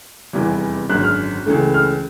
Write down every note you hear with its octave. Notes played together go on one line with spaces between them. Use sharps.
F1 E2 C3 E3 G3
G#1 F#2 D3 F#6
F6
C#2 C#3 E3 A3
F6